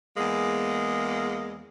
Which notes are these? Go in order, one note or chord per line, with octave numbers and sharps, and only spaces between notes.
E2 G#3 A#3